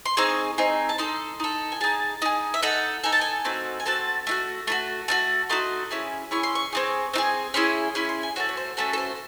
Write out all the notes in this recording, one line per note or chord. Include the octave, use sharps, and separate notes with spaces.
C6
C4 D#4 G#4 C#6
C4 D#4 G#4
A5
D#4 A4 C6
D#4 A4
G#5
D#4 G#4 A5
D#4 G#4
E5
D#4 A4 F#5
D#4 A4 G#5
A5
G#5
A3 C4 D#4 F#4
G#5
A3 C4 F#4 A5
A3 D#4 F#4
A3 D#4 F#4
A3 D#4 F#4
A3 D#4 F#4 C6
C#4 E4 G#4
C#4 E4 G#4 C#6
C6
C#6
C4 D#4 G#4
C4 D#4 G#4
C#4 E4 G#4 C6
C#4 E4 G#4 C6
C6
G#5
A3 C#4 F#4 C#5
C#5
C5
A3 C#4 F#4 A4
A4
C5